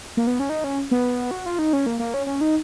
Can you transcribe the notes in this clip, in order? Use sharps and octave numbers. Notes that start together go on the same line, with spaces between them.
A#3
B3
C#4
D#4
C#4
B3
F#4
F4
D#4
C#4
A#3
A#3
C#4
C#4
D#4